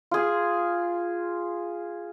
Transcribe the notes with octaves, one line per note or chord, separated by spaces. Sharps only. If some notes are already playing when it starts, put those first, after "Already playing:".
F4 G#4